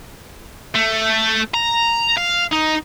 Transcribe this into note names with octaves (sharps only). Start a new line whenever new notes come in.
A3
A#5
F5
D#4